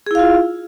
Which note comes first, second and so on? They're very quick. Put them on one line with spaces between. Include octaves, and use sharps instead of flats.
G#4 E4 F5 F4